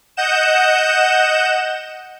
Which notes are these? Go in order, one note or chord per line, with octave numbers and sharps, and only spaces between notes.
D#5 F#5 G6 E7